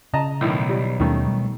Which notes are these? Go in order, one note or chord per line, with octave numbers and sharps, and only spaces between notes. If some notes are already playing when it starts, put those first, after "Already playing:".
C#3 D#5 A5 A#5
B1 A2 D#3
G3
D#2 D#3 G3 A3 C#4
G3